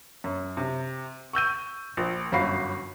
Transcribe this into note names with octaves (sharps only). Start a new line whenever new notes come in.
F#2
C3
C#6 E6 G6 D#7
A#1
G1 F#2 F#4 F5 B5 C7